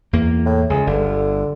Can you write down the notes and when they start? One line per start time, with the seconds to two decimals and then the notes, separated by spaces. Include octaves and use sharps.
0.13 E2 A#3
0.45 A2
0.70 C#2 G#4
0.87 G1 D3